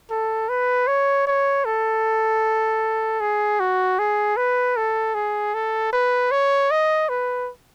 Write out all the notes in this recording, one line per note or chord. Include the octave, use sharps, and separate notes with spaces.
A4
B4
C#5
C#5
A4
G#4
F#4
G#4
B4
A4
G#4
A4
B4
C#5
D#5
B4